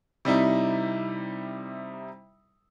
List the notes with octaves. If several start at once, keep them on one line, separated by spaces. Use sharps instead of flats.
C3 G3 D#4 E4